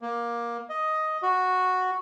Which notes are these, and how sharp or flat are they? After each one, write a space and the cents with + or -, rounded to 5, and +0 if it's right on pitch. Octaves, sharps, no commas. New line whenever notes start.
A#3 +15
D#5 +5
F#4 -5